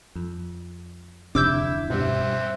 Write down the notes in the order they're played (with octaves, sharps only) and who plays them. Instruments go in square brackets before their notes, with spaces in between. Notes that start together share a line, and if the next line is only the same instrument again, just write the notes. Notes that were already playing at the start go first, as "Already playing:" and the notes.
[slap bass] F2
[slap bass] D1 F2 D4 [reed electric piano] C3 [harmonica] E4 [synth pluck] D6 E6 G6
[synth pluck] G2 [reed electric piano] B2 G3 [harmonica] C4 E5 F#5